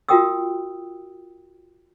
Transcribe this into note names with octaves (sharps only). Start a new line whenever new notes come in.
F4 F#4 A#4 G5 D#6 E6